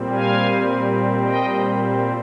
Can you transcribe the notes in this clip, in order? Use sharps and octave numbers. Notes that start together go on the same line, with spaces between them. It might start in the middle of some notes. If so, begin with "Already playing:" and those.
Already playing: A#2 G3 C4
F5 G#5
D#5 G5